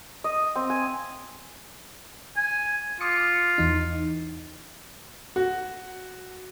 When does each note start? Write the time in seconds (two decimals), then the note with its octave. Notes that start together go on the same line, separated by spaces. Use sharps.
0.24 D#5
0.56 C4
0.70 G#5
2.37 G#5
3.01 F4 D6 D#6 C#7
3.58 E2 E3 D#4
5.36 F#4